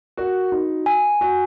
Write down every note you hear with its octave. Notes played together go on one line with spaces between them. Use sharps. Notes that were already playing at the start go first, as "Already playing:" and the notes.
F#4 A#4
D#4 F#4
G#5
F#4 G#5